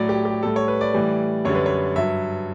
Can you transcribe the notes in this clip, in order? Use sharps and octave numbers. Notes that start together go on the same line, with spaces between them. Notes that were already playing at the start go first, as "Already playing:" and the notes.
Already playing: A2 F#3 D5
G4
G4
A2 G3 A4
C#5
B4
D5
A2 E3 G3
F#2 D3 G3 C#5
B4
C#5
G2 F#3 E5